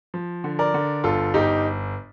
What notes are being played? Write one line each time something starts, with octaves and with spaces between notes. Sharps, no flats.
F3
D3
A#4 D5
D3
G1 F4 A4
G1 D#4 G4